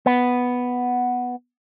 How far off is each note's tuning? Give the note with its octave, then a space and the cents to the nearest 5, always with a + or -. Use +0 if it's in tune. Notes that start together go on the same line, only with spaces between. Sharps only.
B3 +0